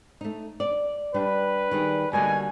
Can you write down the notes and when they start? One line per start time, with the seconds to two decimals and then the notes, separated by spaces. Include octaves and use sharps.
0.21 A3 D#4
0.60 D5
1.14 G3 D4 B4
1.71 D#3 G3 G#4
2.13 B2 D3 G3 A#3 G#5